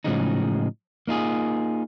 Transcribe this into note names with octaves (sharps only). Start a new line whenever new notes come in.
A2 C#3 F3 F#3 G#3 D#4
A#3 D#4 F4 G#4